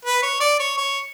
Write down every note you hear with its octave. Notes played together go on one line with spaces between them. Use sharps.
B4
C#5
D5
C#5
C#5